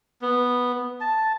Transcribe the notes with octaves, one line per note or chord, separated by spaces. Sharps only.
B3
A5